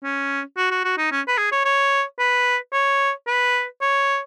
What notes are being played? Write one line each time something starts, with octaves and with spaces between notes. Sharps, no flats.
C#4
F#4
F#4
F#4
D#4
C#4
B4
G#4
C#5
C#5
B4
C#5
B4
C#5